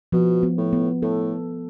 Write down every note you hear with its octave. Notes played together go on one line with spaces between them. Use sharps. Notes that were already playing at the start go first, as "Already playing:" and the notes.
B2 F3
B3
A2
B3
A2 A4